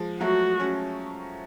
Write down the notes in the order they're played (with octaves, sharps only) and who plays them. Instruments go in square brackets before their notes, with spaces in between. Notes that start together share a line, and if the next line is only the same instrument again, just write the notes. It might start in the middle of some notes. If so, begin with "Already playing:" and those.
Already playing: [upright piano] F3 G#3
[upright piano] F#3 A3 [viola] F#4
[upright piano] C#4